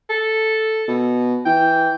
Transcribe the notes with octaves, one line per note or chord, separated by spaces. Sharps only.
A4
B2
E3 G5